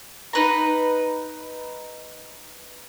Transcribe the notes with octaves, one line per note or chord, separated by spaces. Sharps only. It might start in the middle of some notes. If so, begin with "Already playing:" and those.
D#4 B4 A#5